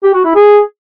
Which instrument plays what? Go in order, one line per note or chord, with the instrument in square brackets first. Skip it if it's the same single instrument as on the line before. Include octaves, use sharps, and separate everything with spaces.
[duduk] G4
F#4
E4
G#4